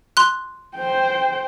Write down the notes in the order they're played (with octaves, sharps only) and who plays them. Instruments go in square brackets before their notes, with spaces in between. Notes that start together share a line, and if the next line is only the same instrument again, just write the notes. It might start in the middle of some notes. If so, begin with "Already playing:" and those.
[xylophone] C6 F#6
[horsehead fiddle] C5 G5